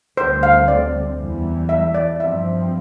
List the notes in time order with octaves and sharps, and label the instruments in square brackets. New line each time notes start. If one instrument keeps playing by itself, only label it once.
[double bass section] D2 D3 G3 C4 [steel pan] C5
[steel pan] F5
D5
[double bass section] E2 E3 G3
[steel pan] E5
D5
[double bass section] G2 F3 C4 [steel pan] E5